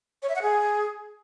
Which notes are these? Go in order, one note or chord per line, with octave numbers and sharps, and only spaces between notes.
C#5
E5
F#5
G#4